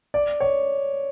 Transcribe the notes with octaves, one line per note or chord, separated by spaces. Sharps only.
D5
C#5